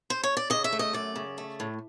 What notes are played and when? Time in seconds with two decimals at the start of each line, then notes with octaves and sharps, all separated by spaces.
0.10 C5
0.23 C#5
0.37 D5
0.50 C#3 D#5
0.64 E5
0.72 A3
0.79 D#5
0.93 F#2 D5
1.16 C#3
1.38 A3
1.60 A2